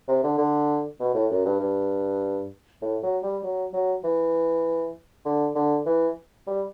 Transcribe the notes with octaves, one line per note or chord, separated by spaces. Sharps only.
C3
D3
D3
B2
A2
F#2
G2
G2
A2
F#3
G3
F#3
F#3
E3
D3
D3
E3
G3